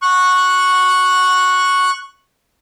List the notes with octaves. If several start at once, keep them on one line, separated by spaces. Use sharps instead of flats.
C#6 F#6